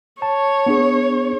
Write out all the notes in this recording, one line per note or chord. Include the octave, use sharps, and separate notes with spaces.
C#5 A5
B3 D4 G#4